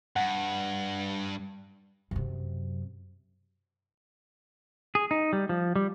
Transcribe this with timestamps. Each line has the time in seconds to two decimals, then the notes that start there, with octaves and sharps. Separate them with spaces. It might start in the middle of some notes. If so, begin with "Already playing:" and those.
0.16 G2 F#5
2.11 F#2 C3
4.95 G#4
5.11 D#4
5.33 G3
5.49 F3
5.76 G3